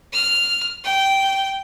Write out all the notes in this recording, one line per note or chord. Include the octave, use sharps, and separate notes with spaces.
F6
G5